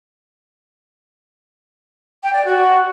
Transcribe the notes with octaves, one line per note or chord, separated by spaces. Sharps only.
G5
D5
F#4